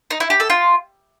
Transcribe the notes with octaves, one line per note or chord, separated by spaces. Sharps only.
D#4
E4
G4
A4
F4